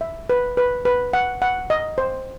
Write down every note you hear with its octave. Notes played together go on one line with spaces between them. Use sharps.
E5
B4
B4
B4
F#5
F#5
D#5
C5